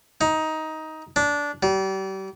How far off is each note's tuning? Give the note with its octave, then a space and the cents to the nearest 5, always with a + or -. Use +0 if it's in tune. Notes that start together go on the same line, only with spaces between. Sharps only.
D#4 +15
D4 -15
G3 -35